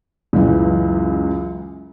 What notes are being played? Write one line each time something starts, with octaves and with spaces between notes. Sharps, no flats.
C#2 F#2 E3